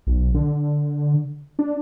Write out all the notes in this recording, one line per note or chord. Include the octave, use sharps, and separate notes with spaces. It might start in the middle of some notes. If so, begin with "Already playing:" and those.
B1
D3
D4